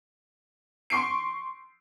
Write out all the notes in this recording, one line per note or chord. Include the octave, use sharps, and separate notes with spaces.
C6 C#6 C7 D7